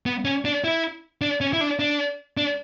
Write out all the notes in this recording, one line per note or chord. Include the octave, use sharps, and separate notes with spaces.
B3
C#4
D4
E4
D4
C#4
E4
D4
D4
D4